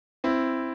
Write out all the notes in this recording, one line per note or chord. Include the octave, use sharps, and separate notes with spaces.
C4 E4